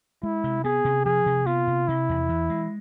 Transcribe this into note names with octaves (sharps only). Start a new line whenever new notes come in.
G#3 E4
C3
B3 G#4
C3
F3 G#4
C3
B3 F4
C3
C3 E4
E2
E3
G#3